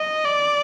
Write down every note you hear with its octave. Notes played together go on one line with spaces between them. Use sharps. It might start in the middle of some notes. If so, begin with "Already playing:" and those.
Already playing: D#5
D5